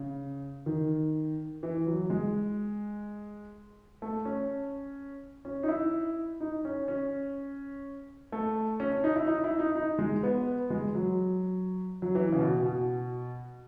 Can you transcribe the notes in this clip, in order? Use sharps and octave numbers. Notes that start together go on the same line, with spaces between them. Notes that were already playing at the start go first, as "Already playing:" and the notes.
Already playing: C#3
D#3
E3
F#3
G#3
A3
C#4
C#4
D#4
E4
D#4
C#4
C#4
A3
C#4
C#4
D#4
E4
D#4
E4
D#4
D#4
G#3
B3
G#3
F#3
F#3
E3
C#3
B2
B2